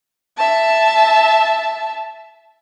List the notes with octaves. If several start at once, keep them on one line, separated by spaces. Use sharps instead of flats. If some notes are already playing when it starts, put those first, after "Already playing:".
E5 A5